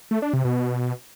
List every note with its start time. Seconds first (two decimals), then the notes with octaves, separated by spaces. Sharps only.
0.11 A3
0.22 D4
0.33 C3
0.45 B2